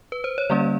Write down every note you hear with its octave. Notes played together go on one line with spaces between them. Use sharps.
B4
C5
C#5
D3 G3 A#3 C#4 D5